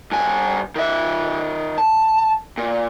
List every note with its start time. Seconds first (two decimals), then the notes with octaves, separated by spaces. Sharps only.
0.12 G2 G#5
0.76 D#3 E5
1.78 A5
2.58 A#2